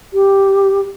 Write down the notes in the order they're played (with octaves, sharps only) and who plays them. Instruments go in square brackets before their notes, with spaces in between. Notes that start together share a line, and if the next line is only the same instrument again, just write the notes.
[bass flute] G4